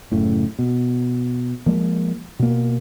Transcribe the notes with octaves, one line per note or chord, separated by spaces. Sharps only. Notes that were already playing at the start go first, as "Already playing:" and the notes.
F#1 A2 C#3
B2
F3 G#3 A#3
B2 A#3